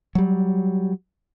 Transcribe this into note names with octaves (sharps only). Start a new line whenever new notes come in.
F#3 G3